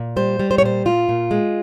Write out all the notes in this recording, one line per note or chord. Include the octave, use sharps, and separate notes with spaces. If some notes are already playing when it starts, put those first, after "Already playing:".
Already playing: A#2
G3 C5
G3
C5
C#5
A#2 C5
A#2 F4
A#2
G#3